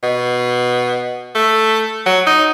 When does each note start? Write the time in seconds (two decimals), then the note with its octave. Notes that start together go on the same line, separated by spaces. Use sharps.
0.03 B2
1.35 A3
2.06 F#3
2.26 D#4